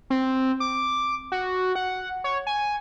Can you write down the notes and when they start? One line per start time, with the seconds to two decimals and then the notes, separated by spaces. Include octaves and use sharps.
0.10 C4
0.60 D6
1.32 F#4
1.75 F#5
2.24 C#5
2.47 G#5